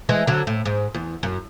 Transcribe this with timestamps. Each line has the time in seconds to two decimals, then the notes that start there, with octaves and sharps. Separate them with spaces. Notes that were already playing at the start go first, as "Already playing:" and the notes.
0.09 E3 G#3
0.27 D3 F#3
0.47 A2
0.66 G#2
0.95 E2
1.23 F#2